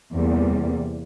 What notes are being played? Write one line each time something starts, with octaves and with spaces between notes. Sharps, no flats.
E2 C3 G3 A#3